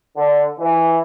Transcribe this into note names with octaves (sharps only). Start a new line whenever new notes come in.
D3
E3